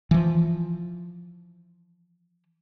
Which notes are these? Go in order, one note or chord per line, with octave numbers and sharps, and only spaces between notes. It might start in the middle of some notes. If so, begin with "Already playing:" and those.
E3 F3